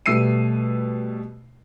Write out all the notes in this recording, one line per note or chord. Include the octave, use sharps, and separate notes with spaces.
B2 G3 A3 E6 C7 D#7